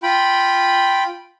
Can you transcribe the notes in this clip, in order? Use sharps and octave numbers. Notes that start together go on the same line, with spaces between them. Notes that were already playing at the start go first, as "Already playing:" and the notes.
F4 G5 B5